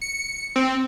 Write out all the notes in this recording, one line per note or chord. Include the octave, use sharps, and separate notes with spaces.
C#7
C4